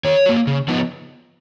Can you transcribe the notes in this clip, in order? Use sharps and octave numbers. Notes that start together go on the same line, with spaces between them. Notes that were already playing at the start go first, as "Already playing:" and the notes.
D#3 C#5
F#3 A#3
C#3
F3 B3 D#4